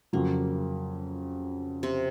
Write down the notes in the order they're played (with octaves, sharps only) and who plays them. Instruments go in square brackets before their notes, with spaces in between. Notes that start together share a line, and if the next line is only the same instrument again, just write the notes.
[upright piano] F2 C#3 F#3 [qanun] A#3
[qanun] C3 C4